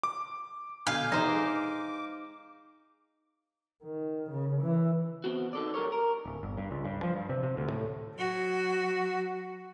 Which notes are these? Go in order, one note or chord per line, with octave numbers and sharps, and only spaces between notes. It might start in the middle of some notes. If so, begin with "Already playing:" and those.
D6
B1 D3 F5 G#5 G6 C7
F2 C3 E3 D#4 C5
G#3 D6
D#3
C#3
E3
B3 C4 F#4
D#4 A4 D5
G2 G4 A#4 C#5
A#4
D1
G1
G2
C#2
G2
F3
G2
C3
C3
D2
A2
F#3 F#4